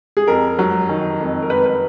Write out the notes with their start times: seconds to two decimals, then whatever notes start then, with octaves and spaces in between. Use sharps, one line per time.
0.17 G#4
0.27 F2 A#4
0.59 F#3
0.89 D#3
1.20 F2
1.42 A#4
1.50 F2 B4
1.66 B4